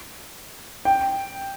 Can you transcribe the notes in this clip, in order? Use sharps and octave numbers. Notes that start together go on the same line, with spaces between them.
G5